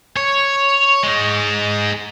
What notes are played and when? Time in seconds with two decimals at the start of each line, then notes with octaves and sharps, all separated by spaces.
0.17 C#5
1.03 G#3 D#4